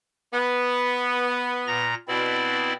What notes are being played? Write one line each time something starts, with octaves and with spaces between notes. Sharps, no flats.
B3
A#2 A#5 A#6
B2 C4 E4 D5